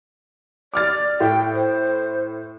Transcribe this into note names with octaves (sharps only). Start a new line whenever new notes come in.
D5 D6 F6 A6
A2 G5
C5